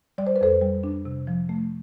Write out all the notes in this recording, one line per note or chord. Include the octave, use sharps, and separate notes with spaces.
G3 D5
C5
B4
F2 A4 C5
G3
D4
C3
F3
A3